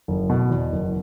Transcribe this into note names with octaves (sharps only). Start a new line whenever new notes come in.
F#1
B2
E2
F#1